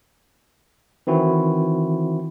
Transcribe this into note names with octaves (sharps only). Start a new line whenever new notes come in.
D#3 E3 C4 E4 F#4